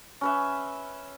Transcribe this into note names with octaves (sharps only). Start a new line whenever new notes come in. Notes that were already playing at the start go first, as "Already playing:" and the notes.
C#4 B4 E5